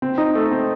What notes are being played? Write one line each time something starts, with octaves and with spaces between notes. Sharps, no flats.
C4
D#4
A3
C4